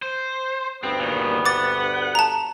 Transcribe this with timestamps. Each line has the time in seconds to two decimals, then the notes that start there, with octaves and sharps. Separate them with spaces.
0.02 C5
0.83 D2 G2 B3 C4
1.00 A#2 D#3
1.46 F#5 D6 A6
2.15 A5 A#5